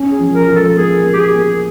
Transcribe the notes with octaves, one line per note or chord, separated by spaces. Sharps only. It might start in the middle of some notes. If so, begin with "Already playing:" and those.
Already playing: C#4
G#4
F3
A#4
F3
A4
A#3 G#4
A#3
G4
G#4
A#3